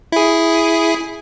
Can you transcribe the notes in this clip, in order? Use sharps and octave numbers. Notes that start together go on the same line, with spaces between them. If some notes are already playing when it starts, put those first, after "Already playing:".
E4 G#4